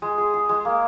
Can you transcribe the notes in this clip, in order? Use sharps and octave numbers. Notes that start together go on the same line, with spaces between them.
G#3
G#4
G#4
G#3
A#3